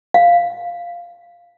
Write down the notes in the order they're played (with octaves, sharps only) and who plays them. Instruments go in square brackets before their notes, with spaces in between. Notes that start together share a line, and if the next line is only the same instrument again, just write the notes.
[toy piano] F5